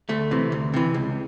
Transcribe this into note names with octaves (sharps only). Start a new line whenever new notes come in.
D2 A3
C3 E3
D2
C3 E3
C#2